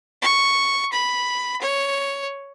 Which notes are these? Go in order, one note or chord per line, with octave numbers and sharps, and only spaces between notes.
C#6
B5
C#5